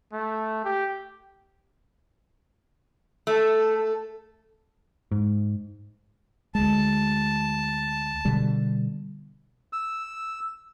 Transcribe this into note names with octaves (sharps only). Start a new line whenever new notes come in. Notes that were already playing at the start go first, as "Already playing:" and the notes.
A3
G4
A3 A4
A4
G#2
D2 G#3 A5
B2 D3 G3
E6